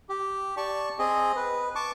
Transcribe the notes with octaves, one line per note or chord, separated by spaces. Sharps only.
G4
D5 A5 C#6
C4 G#4 D#5
B4
A5 C#6 D6